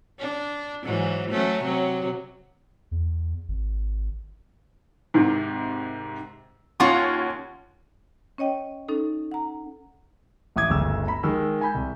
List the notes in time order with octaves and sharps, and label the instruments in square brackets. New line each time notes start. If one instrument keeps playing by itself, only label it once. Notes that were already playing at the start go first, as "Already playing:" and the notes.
[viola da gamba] D4
G#2 E3 F#3
F#3 A3 C#4
C3 F#3
[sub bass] E2
G#1
[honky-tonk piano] G#2 C3 D#3
[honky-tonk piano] D#2 C#4 [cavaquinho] F4 F#5 C#6
[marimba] C#4 C#5 D#5 G5
C#4 D#4 A4
F#5 A#5
[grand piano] A1 E5 D6 D#6 G#6
G1 D2 C#3 E6
A#5 B5
D#3 G#3 E6
G#5 B5 G6
C2